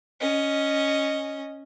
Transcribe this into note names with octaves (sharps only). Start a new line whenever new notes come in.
C#4 D#5